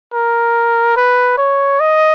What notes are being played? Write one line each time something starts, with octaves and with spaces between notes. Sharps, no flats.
A#4
B4
C#5
D#5